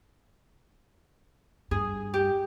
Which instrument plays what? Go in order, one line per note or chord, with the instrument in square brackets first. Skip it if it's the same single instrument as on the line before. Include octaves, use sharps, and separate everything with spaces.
[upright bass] G2 [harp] G#4
[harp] G4